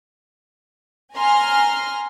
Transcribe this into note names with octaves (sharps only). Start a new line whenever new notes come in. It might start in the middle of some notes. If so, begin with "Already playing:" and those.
G#5 A#5 C6 F6